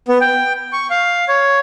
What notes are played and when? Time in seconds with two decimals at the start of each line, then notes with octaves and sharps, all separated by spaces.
0.08 B3
0.21 G5
0.73 C#6
0.90 F5
1.28 C#5